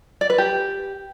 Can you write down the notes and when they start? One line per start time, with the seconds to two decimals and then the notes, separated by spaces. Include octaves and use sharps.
0.21 D5
0.30 B4
0.38 G4